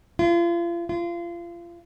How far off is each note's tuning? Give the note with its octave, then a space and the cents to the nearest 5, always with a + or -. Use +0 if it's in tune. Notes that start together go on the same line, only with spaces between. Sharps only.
F4 -35
F4 -30